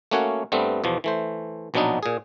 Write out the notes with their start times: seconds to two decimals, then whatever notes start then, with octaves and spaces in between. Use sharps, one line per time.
0.11 A3 A#3 C#4 F#4 C#5 F#5
0.52 G2 G3 A3 B3 C4
0.84 E2 B2 F3
1.04 E3 A3 C5
1.74 A#1 B2 F#3 B3 D4 D#4
2.03 A#2 G#4